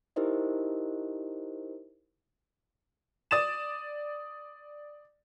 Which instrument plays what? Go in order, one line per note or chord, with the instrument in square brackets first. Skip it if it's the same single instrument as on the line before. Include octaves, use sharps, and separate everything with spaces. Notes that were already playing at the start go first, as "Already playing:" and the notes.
[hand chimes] D#4 E4 G4 A#4 C5 D#5
[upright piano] D5 D#6 A6 E7